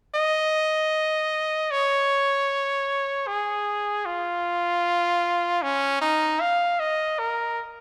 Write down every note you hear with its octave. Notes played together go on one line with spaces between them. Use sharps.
D#5
C#5
G#4
F4
C#4
D#4
F5
D#5
A#4